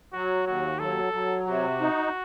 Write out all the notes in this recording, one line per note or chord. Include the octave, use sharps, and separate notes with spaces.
F#3 F#4
D#2 F#4
F#3 A4
F#3
C3 F#4
D#4